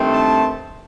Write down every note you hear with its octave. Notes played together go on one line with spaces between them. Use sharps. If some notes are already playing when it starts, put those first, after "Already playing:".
Already playing: G2 D#3 A3 C4
A5